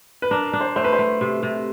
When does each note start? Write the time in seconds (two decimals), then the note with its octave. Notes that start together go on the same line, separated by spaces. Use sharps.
0.22 B4
0.31 D4 A#4
0.53 D4
0.61 C5
0.76 A3 C5
0.84 B4
0.93 C5
0.99 A3
1.21 C3
1.43 C3